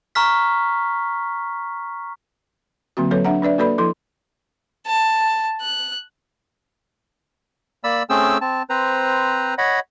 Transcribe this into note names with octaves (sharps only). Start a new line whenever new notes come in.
A#5 C#6 F6 B6
D3 F#3 A#3 C4 F#4
F#3 C4 A4 B4 C#5
D4 E5 F#5 A#5
D4 B4 D5 E5
A#3 F#4 A4 B4 D5 B5
F3 E4 A4 C6
A5
F#6
A#3 D5 B5 E6
A3 C4 C#4 G#4 G5 E6
C4 A5
C4 B4 C5 A#5
C#5 D#5 F#5 B5